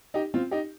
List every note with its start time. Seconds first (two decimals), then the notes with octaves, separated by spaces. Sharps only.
0.14 D#4 G4
0.34 C4 F4
0.51 D#4 G4